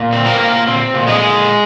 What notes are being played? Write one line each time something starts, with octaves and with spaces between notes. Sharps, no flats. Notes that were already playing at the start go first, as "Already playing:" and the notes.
Already playing: A#2
C4
A#3 A#4
A#2
C4
A#2
G#3 G#4
A#2